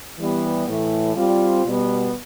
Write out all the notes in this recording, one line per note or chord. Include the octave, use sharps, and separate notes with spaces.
E3 G3 B3
A2 E3 A3
G3 C4 F4
B2 G3 B3